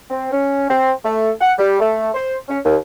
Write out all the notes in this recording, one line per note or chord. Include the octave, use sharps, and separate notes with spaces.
C4
C#4
C4
A3
F#5
G3
A3
C5
C#4
D#2